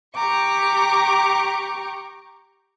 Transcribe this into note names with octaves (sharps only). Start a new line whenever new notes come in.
G4 G5 A#5 C#6 D6